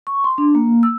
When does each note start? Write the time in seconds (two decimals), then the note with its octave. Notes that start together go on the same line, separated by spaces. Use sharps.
0.07 C#6
0.24 C6
0.38 D4
0.55 A#3
0.83 E6